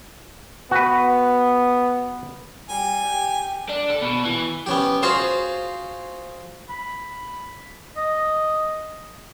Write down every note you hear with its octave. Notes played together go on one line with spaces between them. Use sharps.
B3 F#4 B4
G3 G#5
G4
D4
A4
B2
E3
B3 C#4 G4
F4 F#4 G#4 C5 C#5 F5
B5
D#5